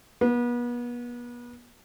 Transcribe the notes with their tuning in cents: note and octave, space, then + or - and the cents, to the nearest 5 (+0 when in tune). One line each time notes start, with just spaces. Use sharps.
B3 -35